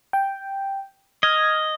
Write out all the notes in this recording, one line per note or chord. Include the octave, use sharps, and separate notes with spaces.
G5
D#5 F6 G#6